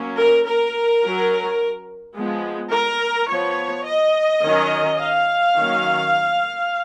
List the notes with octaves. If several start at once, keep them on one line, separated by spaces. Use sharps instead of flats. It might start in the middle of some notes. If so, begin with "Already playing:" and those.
Already playing: F#3 A#3 C#4
A#4
A#4
F#3 C#4
F3 G#3 B3
A#4
F3 B3 C#5
D#5
D#3 F#3 C#4
F5
D#3 F#3 A#3 C#4